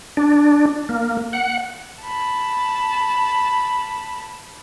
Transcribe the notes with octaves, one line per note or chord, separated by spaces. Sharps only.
D4
A#3
F#5
A5 B5